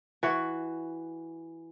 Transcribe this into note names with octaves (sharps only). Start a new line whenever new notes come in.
E3 F#4